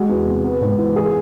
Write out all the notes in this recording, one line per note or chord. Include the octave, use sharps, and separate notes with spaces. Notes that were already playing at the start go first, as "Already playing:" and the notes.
Already playing: G#3 F#4
E2
C3
B3
G#2
E3
G#4